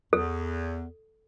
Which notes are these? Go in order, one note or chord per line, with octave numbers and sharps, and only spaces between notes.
E2 A4